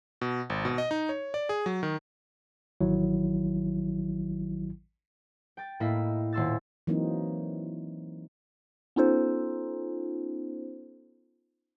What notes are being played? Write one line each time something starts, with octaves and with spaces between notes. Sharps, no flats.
B2
G#1
B2
D#5
D#4
C#5
D5
G#4
F#3
D#3
A1 D#3 F#3 E4
G5 A6
A2 A#3 E4 D#5 B6
D#1 C6 E6 A6
E3 F#3 A#3 C4 D#4
B3 C#4 D#4 F4 A4 C5